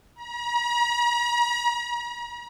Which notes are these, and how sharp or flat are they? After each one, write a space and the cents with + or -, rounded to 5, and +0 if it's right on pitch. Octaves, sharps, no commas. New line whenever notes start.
A#5 +45